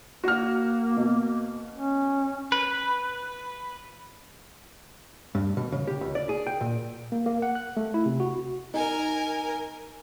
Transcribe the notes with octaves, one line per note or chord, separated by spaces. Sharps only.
A#3 F#4 F6
B2
C#4
B4
G2
B2
C#3
G4
C#2
D5
G#4
G5
A#2
A#3
A#3
F#5
F#6
A3
E4
C3
F#4
D#4 A#4 G#5